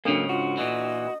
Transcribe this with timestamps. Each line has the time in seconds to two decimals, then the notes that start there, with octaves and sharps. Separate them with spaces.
0.05 G#2 C#3 F#3 A#3 C#4 D4 A4
0.29 F4 F#4
0.58 A#2 E3 D#5